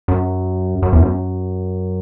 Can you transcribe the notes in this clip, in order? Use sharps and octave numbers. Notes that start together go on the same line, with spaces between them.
F#2
F#2
E2
F#2